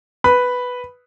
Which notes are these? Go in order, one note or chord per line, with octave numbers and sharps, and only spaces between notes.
B4 B5